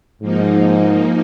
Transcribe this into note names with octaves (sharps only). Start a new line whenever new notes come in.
G#2 F3 A#3 D#4